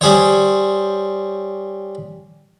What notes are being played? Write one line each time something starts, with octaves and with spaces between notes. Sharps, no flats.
G3 G#4 C5 C#5